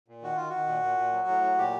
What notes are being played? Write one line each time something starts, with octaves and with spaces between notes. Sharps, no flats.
A#2
D#3 F#4
D#3 F4
D#3 F#4
A#2
A#2
A#2
F#3
A2
F#3
A#2 G4